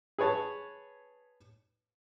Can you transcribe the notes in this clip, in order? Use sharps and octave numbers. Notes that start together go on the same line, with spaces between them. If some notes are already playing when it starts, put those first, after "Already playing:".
G#4 B4 C#5 A5